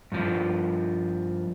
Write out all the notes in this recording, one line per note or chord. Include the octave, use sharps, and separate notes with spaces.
G2 F3